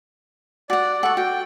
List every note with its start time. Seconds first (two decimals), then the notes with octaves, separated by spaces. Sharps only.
0.70 F#4 D5 F#5
1.03 A4 F#5 C#6
1.17 F#4 G5